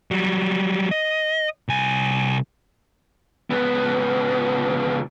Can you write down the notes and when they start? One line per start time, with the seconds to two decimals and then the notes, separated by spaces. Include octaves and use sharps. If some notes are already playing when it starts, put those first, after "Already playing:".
0.11 F#3 G3
0.91 D#5
1.68 C2 G#5
3.50 C#2 B3